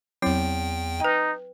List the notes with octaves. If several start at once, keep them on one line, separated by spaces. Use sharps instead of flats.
E2 F#3 C4 E4 G5
D#4 B4 G5